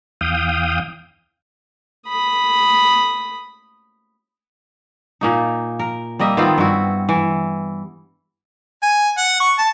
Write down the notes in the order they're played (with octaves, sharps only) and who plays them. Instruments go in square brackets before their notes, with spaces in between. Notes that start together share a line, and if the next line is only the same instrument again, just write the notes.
[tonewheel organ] E2 F5 G5 D#6
[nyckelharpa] B5 D#6
[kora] A#2 A#3 D#4
A#4
G3 A#3 D#5 E5
D#3 B3 C4 F4
G2 E4 F#4
E3
[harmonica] G#5
F#5
C#6
A5